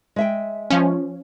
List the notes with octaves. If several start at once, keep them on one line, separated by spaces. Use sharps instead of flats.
G#3 E5 G5
F3 C#4